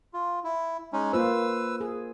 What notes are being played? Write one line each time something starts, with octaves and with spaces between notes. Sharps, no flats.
F4
E4
G#3 C#4 D#4
A#3 F4 B4 C5 E6
G#4